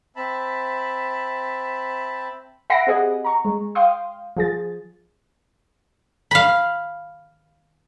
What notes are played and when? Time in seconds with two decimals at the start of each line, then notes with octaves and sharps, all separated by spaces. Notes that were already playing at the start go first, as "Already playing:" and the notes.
0.16 C4 E5 A5 B5
2.70 E5 F#5 B5 A#6 C7 D7
2.87 C4 G4 G#4 D#5 F#5
3.24 A#5 C#6
3.45 G#3
3.75 F5 G5 C6 D#6
4.37 F3 G#4 A6
6.31 F5 B5